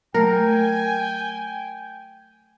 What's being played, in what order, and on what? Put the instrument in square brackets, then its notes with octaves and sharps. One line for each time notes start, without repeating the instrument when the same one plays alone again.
[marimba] F#3 A3 [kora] A#4 [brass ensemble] G5 G#5